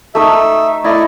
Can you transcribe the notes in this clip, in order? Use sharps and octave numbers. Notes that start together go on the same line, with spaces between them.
A3 D#4 E5
A3 E4 D5 D#5